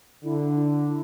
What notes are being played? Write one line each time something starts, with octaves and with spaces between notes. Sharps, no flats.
D3 E4
E4
E4